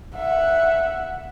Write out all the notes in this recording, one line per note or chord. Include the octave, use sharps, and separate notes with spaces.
E5 F#5